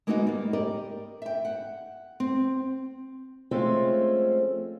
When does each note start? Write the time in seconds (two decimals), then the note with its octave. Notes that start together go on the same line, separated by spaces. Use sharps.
0.07 G#3 A#3 B3 D#4 F#4 D#5
0.27 G3 A#3
0.53 G4 A#4 D5 D#5
1.22 E5 G5
1.45 F#5
2.20 C4
3.51 F3 G#3 A3 C4 C#4 F4